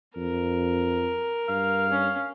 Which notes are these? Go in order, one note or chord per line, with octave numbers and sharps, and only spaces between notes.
F2 A#4
G2 F5
C#4